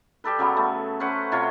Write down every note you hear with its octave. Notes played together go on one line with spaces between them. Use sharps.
G3 G4 A4 B4
C#3 F#3 G3 B3
A3
C#4 B4 C5 F#5
C3 F4 C5 C#5